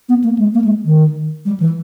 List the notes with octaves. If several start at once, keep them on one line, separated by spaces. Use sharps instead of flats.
B3
A#3
G#3
A#3
G#3
D#3
G3
E3